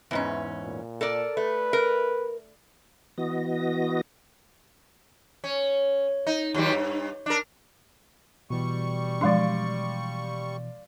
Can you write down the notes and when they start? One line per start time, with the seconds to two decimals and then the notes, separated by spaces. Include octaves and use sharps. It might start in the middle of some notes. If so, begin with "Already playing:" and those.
0.11 E2 G#2 E3 C#4
0.64 A#2
1.01 A4 A#4 D5
1.37 A3 B4
1.73 A#4
3.18 E3 B3 F#4 D#5 A#6
5.44 C#4
6.27 D#4
6.54 D#2 F#3 G3
6.72 G2
7.26 D4 A#4
8.50 B2 E3 G3 C#6
9.21 F3 G#3 D4 D5 F5 C6